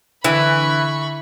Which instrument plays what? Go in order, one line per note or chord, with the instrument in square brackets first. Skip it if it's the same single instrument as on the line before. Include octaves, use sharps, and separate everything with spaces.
[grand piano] D3 [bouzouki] E3 [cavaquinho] E4 [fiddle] B5 C#6